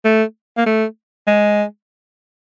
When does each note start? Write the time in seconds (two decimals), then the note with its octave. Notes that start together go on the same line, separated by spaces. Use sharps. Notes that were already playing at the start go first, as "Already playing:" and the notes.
0.05 A3
0.57 A#3
0.66 A3
1.27 G#3